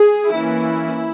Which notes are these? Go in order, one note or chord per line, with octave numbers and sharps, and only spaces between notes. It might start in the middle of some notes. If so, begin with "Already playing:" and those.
Already playing: G#4
E3 A#3 C#4 E4